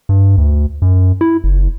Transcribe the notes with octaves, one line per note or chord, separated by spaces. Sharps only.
G2
D2
F#2
E4
F#1